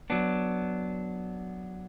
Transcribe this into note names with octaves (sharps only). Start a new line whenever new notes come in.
F#3 B3 D4